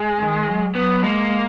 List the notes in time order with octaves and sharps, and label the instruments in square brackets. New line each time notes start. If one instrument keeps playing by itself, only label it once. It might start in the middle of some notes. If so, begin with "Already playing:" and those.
Already playing: [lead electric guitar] G#3
[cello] D#3
F#3
[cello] F#3 [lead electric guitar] B3
[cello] G#3 [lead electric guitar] A#3